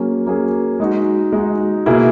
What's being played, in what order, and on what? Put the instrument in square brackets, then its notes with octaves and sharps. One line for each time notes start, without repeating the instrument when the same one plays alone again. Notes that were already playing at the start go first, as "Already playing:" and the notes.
Already playing: [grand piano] F#3 A#3 C#4 G#4
F#3 A#3 C#4 G#4
G#3 D#4 F#4
G#3 D#4 F#4
B2 A#3 E4 G#4